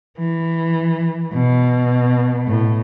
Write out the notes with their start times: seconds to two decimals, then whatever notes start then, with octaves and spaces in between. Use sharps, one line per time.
0.18 E3
1.34 B2
2.47 A2